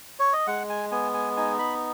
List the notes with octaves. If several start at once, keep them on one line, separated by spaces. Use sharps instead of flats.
C#5
D#5
G#3 F#5
G#5
B3 G#5
G#5
D#4 G#5
B5